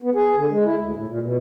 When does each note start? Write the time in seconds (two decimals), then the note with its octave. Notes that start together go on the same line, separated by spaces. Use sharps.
0.02 B3
0.15 G#4
0.37 D3
0.51 G#3
0.65 E4
0.79 D2
0.96 A2
1.08 A#2
1.22 B2